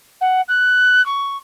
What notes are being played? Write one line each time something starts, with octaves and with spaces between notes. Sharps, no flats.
F#5
F#6
C#6